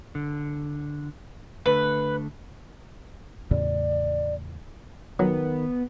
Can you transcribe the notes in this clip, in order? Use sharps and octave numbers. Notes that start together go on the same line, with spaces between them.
D3
D3 A3 B4
E2 A2 C#3 D5
D#3 F#3 B3